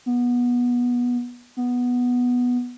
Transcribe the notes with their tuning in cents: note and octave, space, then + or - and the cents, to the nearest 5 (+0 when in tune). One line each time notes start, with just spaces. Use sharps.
B3 -20
B3 -5